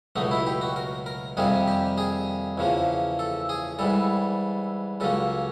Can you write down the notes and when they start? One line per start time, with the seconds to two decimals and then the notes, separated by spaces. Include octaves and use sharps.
0.16 C#2 B2 F#3 A3 D#4
0.31 E4
0.46 G4
0.61 F#4
0.76 A#4
1.06 A#4
1.37 F2 C3 D#3 G3 A#3 G#4
1.67 G4
1.98 G#4
2.58 E2 C#3 F3 A#3
3.19 A4
3.49 G#4
3.79 G#2 E3 G3 A4
5.00 C#2 C#3 F#3 A#3 A4